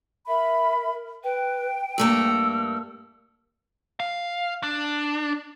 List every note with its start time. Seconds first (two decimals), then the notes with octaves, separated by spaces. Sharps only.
0.28 A#4 E5 B5
1.24 B4 G5
1.98 G2 A3 A#3 E6
4.00 F5
4.63 D4